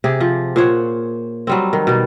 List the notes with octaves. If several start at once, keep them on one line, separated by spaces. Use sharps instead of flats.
C3 G4 G#4
F3
A#2 C5 C#5 F#5
F#3 G3 C4
D#3
B2 G3